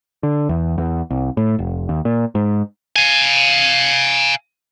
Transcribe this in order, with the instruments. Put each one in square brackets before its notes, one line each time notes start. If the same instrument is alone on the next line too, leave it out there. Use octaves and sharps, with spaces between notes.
[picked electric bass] D3
E2
E2
C2
A2
F1
D#2
A#2
G#2
[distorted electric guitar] F5 G#5